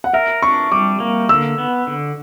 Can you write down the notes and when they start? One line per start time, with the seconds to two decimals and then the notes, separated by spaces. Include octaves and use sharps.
0.04 F#5
0.13 A#4 E5
0.42 D4 C#6
0.72 G3 D6
1.00 A#3
1.29 D3 E6
1.58 B3
1.87 D3